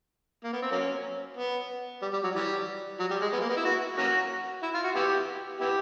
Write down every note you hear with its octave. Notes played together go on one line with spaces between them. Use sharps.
A#3
B3
C4
F#3 A#3 C#4
B3
G3
G3
F#3
E3 G3
F#3
G3
G#3
B3
A#3
B3
E4
F#4
A#3 C#4 F#4
E4
F4
F#4
B3 E4 G4
B3 E4 G4